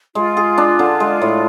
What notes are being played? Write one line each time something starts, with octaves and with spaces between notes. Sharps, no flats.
G#3 F4
G#4
D4
D3
G#3
A2